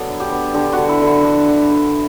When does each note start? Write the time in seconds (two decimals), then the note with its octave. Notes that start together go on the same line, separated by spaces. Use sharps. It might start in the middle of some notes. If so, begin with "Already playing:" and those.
Already playing: F#3 B3 A4 D5
0.09 D3
0.20 G4
0.32 B3
0.54 D3 G4
0.72 D3 F#4
0.89 E4
1.02 D3 E4
1.24 D3
1.48 D3
1.71 D3